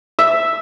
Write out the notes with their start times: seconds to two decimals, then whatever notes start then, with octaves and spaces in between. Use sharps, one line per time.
0.19 E5